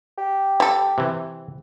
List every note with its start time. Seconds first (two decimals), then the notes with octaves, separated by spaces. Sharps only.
0.18 G4
0.60 G3 A4
0.98 C3 E3